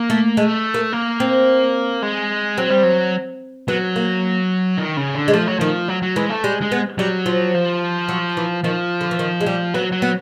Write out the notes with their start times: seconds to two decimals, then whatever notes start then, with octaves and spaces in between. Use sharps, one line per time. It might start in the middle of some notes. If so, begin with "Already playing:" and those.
Already playing: A#3
0.10 A3
0.37 G#3 A3
0.74 A#3
0.93 A#3
1.20 C4
2.03 G#3
2.58 F#3 C4
2.70 G3
2.83 F#3
3.68 F#3 B3
3.96 A#3
4.78 D#3
4.97 C#3
5.14 D3
5.28 G#3
5.33 F3 A3
5.47 F#3
5.59 D#3 F3
5.88 F#3
6.02 F#3
6.16 E3 G#3
6.30 A3
6.44 G3 G#3
6.61 G#3
6.72 B3
6.98 F#3 G3
7.26 F3
7.54 F3
8.09 F#3
8.37 E3
8.64 D#3 F3
9.01 D3
9.11 E3
9.19 D#3
9.41 G#3
9.46 G3
9.74 F#3 B3
9.92 F#3
10.02 B3